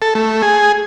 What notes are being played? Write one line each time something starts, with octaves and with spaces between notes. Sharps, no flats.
A4
A3
G#4